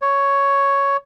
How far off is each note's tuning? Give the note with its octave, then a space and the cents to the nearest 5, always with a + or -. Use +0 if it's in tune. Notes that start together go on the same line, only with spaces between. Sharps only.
C#5 +5